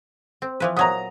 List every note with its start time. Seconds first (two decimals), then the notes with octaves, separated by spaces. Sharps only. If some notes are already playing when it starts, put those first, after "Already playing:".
0.42 C4
0.60 E3 F3 B4
0.77 A#2 F#3 B3 A#5 D#6